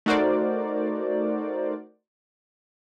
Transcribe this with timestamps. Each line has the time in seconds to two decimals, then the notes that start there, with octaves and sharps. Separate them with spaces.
0.06 A3 D#4 F#4 A#4 C5 D5